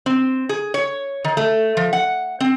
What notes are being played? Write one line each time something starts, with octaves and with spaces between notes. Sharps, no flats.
C4
G#4
C#5
D#3
A3
F3
F#5
C4